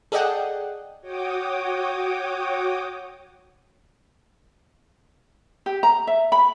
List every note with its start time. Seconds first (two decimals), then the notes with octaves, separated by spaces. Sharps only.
0.12 G#4 A4 D5 D#5 F#5 G5
1.01 F#4 C#5 G5 D6 D#6
5.66 G4
5.83 A#5
6.07 E5
6.32 B5